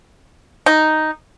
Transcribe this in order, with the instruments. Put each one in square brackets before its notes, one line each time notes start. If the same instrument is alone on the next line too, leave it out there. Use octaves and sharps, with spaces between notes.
[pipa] D#4